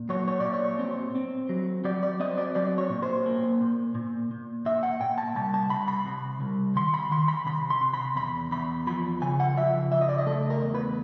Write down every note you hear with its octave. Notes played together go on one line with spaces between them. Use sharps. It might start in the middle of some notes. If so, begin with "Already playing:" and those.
Already playing: A#2
F#3 C#5
C#5
A#2 D5
C#5
C4
C4
F#3
F#3 D5
D5
C4 D#5
D5
F#3 D5
C#5
A#2
C5
A#3
A#2
A#2
A#2
A#2 E5
F#5
A#2 G5
A5
C2 A5
A5
C2 B5
B5
C3
C2
D#3 C6
B5
D#3 C6
B5
C3 B5
C6
C3
B5
E2 B5
E2 B5
F3 B5
C#3 G#5
F#5
F3 E5
C#3 E5
D#5
D5
D#5
A3 A4
A#4
E2
B4